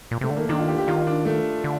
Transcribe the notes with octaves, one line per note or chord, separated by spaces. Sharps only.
A#2
C3 A3
D3
D#3 A#3
D#3 D4
F4
G4
G4
D#3 F4
D4
A3
D3